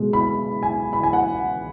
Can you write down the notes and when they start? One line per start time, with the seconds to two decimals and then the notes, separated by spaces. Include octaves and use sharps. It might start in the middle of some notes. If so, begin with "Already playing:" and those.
Already playing: B2 G#3
0.13 B5
0.63 G#5
0.93 B5
1.03 G#5
1.13 F#5